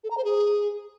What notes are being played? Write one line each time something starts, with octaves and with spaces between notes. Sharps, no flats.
A4
A#5
C5
G#4